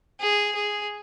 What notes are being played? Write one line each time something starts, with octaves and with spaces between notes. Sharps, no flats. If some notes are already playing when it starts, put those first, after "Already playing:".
G#4
G#4